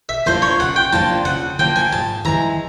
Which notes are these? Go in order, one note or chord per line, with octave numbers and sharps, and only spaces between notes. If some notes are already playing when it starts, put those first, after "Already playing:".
E5
F3 A#3 D4 F4 C5
C#5
C#3 F#5
G5
F3 A#3 D4 F4 A5
C#3 F#5
F3 A#3 D4 F4 G5
G#5
G#2 A5
E3 G#3 A#5